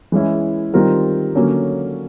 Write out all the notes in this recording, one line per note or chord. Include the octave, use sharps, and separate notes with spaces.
E3 G#3 C#4 E4
D#3 G3 C4 F4 A#4
D3 F#3 A#3 C#4